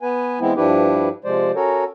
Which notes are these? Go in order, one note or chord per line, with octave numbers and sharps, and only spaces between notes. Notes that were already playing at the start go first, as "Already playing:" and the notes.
B3 B4 G#5
E3 G#3 B3 C4 E4
G2 F3 D4 E4 G4 B4
C3 F3 G#3 C5 D5
C#4 F#4 A4 A#4 C#5